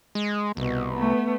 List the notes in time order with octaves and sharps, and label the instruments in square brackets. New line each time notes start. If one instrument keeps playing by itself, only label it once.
[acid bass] G#3
[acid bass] C2 [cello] B2
[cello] A3 B3